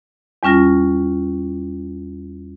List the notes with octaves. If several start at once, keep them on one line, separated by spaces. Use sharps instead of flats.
E2 G3 C#4 F4 A#6